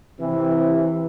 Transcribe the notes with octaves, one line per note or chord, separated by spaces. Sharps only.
C3 E3